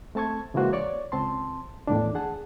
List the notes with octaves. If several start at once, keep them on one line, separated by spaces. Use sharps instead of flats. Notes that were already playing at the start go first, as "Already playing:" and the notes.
A3 C4 A5 C#6 G#6
C#3 E3 G#3 A#3 F#4 C5
C#5 D5 C#6
C#2 C4 A5 C6
E2 A2 D#3 D4
G#4 F#5 A5